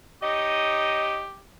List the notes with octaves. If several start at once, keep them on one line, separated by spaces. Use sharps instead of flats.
D#4 G4 C#5 D#5